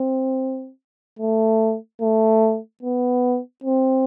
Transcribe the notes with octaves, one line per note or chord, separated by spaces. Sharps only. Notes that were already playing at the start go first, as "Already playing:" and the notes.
Already playing: C4
A3
A3
B3
C4